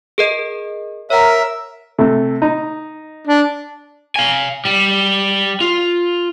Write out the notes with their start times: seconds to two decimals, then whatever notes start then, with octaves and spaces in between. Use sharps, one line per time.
0.18 G#4 A#4 D#5
1.10 A#4 C#5 E5 F#5
1.98 C3 A3
2.42 D#4
3.27 D4
4.16 F5 G#5
4.65 G3
5.61 F4